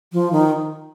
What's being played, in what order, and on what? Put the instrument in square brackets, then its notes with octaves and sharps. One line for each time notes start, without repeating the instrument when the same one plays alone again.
[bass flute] F3
D#3